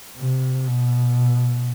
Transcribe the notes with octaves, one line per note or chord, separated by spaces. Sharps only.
C3
B2